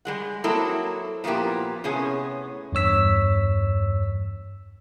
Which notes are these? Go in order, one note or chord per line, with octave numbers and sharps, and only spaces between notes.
G3 G#3 F#5
F#3 A#3 C4 E4 A4 D#5
A#2 F3 A#3 B3 E4 G4
A2 C3 B3 C#4 G#4
E2 G2 C#5 E6 B6